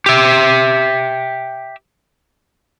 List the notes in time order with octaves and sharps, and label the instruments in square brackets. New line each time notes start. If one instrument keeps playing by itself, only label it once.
[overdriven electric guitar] G4 E5